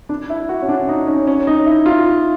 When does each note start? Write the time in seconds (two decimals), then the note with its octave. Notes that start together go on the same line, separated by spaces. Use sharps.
0.09 D4
0.30 E4
0.49 F#4
0.62 C#4
0.69 D4
0.89 D#4
1.07 C#4
1.27 C#4
1.47 D#4
1.66 E4
1.86 F4